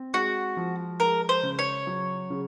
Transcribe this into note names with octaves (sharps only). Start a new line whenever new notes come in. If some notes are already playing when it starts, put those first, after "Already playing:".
Already playing: C4
G#3 F#4
F3
G#3 A#4
C5
C#3
C#5
F#3
C#3